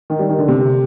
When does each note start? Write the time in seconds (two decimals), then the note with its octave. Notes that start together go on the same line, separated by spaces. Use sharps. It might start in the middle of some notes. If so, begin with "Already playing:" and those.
0.10 D#3
0.19 G3
0.29 D#3
0.39 D3
0.48 C3